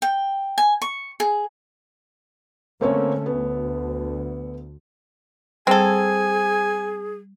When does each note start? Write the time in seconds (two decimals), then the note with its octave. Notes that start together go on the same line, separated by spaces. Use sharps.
0.02 G5
0.58 G#5
0.82 C#6
1.20 G#4
2.81 D3 A3 A#3 C4 C#4 C#5
3.26 D2 B3
5.67 G3 C4 G#4 A4 G#5